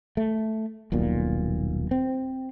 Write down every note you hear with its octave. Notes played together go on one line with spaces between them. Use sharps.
A3
D#1 B1 A#2
C4